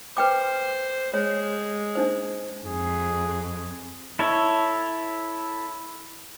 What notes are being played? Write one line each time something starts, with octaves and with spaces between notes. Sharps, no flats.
B4 C5 G5 D6
G#3 C#5
D4 D#4 C5
F2 G#4
E4 A4 C#5